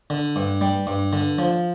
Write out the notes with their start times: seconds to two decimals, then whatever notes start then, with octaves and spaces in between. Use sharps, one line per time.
0.10 D3
0.36 G2
0.61 G3
0.87 G2
1.13 D3
1.39 F3